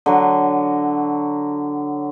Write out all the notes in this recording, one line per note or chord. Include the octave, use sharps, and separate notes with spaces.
D3 F#3